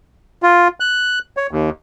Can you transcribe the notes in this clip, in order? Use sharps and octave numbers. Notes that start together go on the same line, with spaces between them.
F4
F#6
C#5
D#2